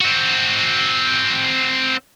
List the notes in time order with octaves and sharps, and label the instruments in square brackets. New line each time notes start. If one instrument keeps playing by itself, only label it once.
[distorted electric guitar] C4 F#4